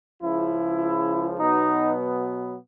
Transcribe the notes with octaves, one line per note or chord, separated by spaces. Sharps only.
C#2 C#3 F3 E4
B2 F#3 B3 D#4